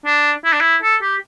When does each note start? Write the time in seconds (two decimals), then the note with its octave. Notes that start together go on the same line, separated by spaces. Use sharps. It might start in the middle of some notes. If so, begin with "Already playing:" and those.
0.06 D4
0.44 E4
0.53 D4
0.61 E4
0.82 A4
1.02 G4